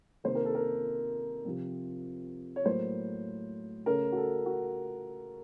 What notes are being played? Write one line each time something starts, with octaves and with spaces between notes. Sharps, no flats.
C3 D#3 A#3 C5
A#4
A4
A#4
C3 F3 C4
C#5
A2 F#3 A#3 C5
C#3 A3 C#4 A#4
F#4
A4
F#4